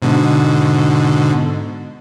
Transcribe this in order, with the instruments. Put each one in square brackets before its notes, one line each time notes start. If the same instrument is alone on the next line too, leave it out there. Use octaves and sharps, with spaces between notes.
[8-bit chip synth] G#2 B2 D3